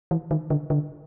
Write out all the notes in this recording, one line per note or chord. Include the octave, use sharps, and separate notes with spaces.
E3
D#3
D3
D3